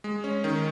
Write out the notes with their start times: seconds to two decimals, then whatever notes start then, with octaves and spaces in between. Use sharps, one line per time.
0.04 G#3
0.24 C#4
0.44 D#3